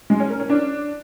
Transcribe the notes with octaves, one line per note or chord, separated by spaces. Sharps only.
G#3
C#4
A#4
C#4
D4